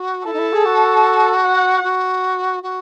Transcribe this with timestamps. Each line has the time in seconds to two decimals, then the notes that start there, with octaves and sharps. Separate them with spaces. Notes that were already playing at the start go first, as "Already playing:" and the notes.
Already playing: F#4
0.26 E4 A4
0.33 D#4
0.39 E4
0.53 G#4
0.65 F#4
1.44 F#5
1.83 F#4
2.63 F#4